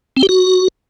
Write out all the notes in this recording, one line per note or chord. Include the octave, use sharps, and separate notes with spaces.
C4
G4
F#4